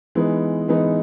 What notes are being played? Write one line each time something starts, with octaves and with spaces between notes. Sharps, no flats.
E3 G#3 B3 D#4
E3 G#3 B3 D#4